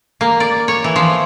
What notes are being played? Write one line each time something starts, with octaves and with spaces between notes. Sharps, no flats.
A#3
D5
C#5
E3
F3